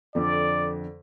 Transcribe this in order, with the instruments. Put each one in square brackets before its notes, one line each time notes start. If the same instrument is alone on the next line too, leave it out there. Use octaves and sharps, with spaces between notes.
[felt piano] F2 D3 [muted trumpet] D5